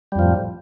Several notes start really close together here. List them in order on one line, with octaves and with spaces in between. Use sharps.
G3 F2 F3 A2